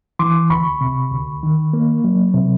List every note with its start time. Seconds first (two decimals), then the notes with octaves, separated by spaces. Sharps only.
0.19 E3 C6 D6
0.50 D2 B5 C#6
0.81 C3
1.11 D2
1.43 D#3
1.73 A#3
2.04 F#3
2.34 C3